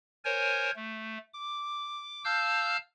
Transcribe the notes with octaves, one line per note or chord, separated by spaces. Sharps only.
A#4 C5 C#5 G#5
A3
D6
F5 A5 E6 F6 G6